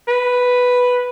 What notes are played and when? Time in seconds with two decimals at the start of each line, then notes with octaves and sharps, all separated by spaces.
0.08 B4